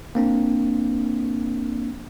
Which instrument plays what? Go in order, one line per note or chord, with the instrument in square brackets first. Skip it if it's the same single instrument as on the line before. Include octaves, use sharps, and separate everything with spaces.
[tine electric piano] A#3 C4 D4